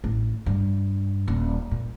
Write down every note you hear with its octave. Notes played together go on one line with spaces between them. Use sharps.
A1
G2
D#1
A#2